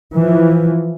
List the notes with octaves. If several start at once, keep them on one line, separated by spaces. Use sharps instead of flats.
E3 F3